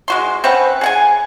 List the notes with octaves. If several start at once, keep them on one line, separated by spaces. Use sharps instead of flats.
G#3 F#4 C6
C4 C#4 B4 F#5
G#4 F#5 G#5